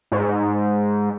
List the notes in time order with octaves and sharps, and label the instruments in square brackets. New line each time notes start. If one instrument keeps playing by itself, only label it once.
[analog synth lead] G#2